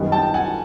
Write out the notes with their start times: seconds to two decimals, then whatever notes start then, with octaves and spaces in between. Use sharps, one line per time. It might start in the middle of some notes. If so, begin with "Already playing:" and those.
Already playing: F#2 D#3 G3 B3
0.12 G5 A5
0.34 F#5 G#5